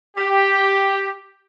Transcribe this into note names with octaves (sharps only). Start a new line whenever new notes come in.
G4